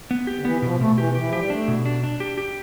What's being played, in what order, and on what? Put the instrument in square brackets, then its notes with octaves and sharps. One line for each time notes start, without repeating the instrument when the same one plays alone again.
[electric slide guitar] B3
G4
[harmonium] D3
[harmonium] E3 [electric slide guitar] B3
[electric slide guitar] B2 [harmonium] F3
[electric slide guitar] B2 [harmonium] A3
[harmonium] E3 [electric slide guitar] G4
[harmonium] E3 [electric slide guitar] G4
[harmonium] F3 [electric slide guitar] G4
[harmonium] G3
[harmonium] A3 [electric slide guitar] D4
[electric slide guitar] B2
D4
D4
G4
G4